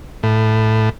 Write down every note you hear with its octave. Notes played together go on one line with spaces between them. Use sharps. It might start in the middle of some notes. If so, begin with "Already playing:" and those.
A2